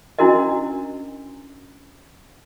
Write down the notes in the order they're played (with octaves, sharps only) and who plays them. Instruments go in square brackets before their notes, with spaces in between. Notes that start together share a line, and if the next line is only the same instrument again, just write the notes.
[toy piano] C#4 D4 E4 F#4 A#4 D#5